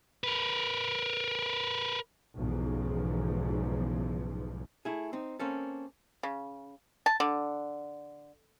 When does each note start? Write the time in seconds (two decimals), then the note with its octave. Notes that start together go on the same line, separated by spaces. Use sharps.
0.24 A#4 B4
2.36 B1 E2 G#2 C#3 F3
4.85 A3 E4 G#4
5.13 C4 D#4
5.39 A#3 C4 C#4 A4
6.23 C#3
7.06 A5
7.20 D3